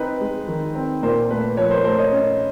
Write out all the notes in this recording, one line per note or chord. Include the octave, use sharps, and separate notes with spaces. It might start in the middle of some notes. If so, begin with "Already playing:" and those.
Already playing: C4 D#4 B4
G#3
D#3
C4
A#2 A#4 C5
A3 B4
F3 B4 C#5
A#4 C5
A3 A#4 C5
C#5 D#5
C#4